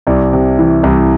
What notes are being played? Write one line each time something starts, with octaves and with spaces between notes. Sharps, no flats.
C2 D5
C3
E3
C2